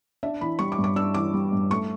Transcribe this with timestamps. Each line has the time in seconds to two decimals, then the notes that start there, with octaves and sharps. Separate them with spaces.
0.23 D4 E5
0.41 E3 B5
0.59 G3 C#6
0.72 D6
0.78 G2
0.84 D6
0.96 D4 E6
1.14 E3 D6
1.34 G3
1.52 G2
1.71 A3 C#6